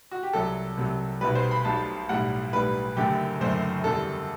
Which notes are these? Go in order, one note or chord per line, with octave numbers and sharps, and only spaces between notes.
F#4
G4
C2 C3 F#3 A4
C2 C3 F#3
B1 B2 G3 B4
C5
B5
B1 B2 G3 A5
B1 A2 G3 F#5
B1 A2 G3 B4
F#1 F#2 D3 A3 G4
F#1 F#2 D3 A3 C5
F#1 E2 D3 G3 A4